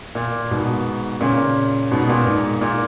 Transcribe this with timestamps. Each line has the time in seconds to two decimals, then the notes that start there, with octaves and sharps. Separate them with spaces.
0.15 A#2
0.51 G#2 B2
1.20 A#2 C#3
1.91 G#2 B2
2.09 A#2
2.26 G#2
2.61 A#2